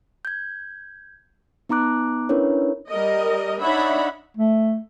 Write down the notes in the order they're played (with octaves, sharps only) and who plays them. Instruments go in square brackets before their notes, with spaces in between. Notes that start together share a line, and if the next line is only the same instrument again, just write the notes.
[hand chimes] G6 G#6
B3 D#4 A#5 D6 F#6
C#4 D4 E4 A#4 B4 C#5
[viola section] G3 A#4 D#5
D4 D#4 C#5 E5 F#5 B5
[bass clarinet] A3